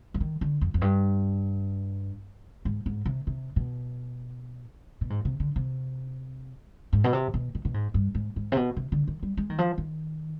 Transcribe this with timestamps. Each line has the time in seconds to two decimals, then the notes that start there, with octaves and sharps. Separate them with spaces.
0.14 F3
0.20 D#3
0.41 D3
0.61 F2
0.74 F2
0.81 G2
2.65 G#2
2.86 G#2
3.05 C3
3.27 C3
3.56 B2
5.01 B2
5.10 G#2
5.25 C3
5.40 D3
5.56 C3
6.93 G#2
7.04 B2
7.13 C3
7.34 B2
7.55 B2
7.65 B2
7.74 G#2
7.94 G2
8.15 G#2
8.36 G#2
8.52 C3
8.57 B2
8.76 C3
8.92 D3
9.07 D#3
9.23 G3
9.37 G#3
9.50 D#3
9.58 F3
9.78 D#3